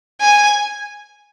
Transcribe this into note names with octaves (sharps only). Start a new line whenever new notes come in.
G#5